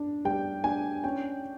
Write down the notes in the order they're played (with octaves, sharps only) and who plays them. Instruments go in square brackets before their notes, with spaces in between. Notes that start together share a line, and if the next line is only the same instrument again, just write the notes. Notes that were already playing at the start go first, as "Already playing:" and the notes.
Already playing: [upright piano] D4
G3 G5
D4 G#5
C#4 G5